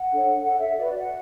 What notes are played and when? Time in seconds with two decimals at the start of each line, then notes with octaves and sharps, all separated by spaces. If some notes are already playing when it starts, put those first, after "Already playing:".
Already playing: F#5
0.11 D4 A4 C#5
0.43 D4 A4 C#5 F#5
0.60 E5
0.77 F#4 B4 D5
0.87 D5
0.99 F#5